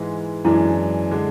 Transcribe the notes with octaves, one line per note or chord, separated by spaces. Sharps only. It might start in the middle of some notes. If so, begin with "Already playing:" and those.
Already playing: G#2 E3 G#3
F#2 E3 G#3 D4 E4
D3 G#3 D4